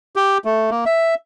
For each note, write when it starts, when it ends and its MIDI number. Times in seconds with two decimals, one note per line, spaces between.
0.16 0.38 67
0.45 0.70 57
0.70 0.84 58
0.86 1.15 76